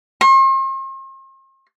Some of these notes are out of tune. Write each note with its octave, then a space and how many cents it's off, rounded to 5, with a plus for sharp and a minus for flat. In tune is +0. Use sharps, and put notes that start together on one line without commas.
C6 +45